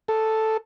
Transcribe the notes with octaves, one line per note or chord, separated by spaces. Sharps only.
A4